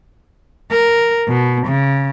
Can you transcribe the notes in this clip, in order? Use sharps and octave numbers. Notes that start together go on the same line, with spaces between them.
A#4
B2
C#3